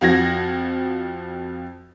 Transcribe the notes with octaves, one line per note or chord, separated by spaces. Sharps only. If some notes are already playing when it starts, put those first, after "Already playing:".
F2 F3 F#4 G#6 A#6